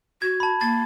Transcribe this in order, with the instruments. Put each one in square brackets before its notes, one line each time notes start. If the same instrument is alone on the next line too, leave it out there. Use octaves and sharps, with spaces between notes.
[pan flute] F#4 [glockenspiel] G#6
[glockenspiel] A5 B5
[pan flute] A#3 [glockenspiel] A6